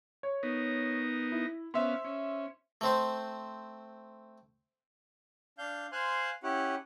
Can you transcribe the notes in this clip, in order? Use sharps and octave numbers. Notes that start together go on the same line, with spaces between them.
C#5
B3 D#4 A#4
E4
B3 C#4 C5 E5 F5 C6
C#4
A3 C4 C5
D4 F5 G6
C5 F5 G#5 C6 F#6
C#4 E4 G4 F#5